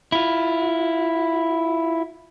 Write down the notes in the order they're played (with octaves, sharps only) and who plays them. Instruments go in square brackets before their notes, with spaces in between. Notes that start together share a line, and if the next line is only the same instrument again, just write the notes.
[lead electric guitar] E4 F4